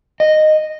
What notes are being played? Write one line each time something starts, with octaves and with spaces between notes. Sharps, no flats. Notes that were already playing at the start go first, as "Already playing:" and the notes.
D#5